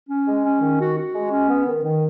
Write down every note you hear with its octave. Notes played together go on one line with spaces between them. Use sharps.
C#4
G#3
C#4
D#3
F#4
F#4
G#3
C#4
B3
D#3
D#3